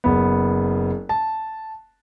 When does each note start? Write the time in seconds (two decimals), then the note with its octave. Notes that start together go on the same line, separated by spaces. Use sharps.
0.04 F#1 B3
1.09 A5